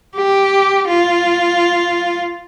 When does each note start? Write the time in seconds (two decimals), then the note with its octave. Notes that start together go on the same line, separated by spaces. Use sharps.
0.17 G4
0.89 F4